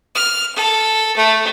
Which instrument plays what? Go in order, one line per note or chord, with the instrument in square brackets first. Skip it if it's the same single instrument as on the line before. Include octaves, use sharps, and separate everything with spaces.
[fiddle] F6
A4
A3